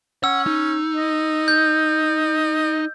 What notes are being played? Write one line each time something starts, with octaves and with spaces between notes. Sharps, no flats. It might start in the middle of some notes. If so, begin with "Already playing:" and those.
C#4 F#5 E6
D#4
D#5
G6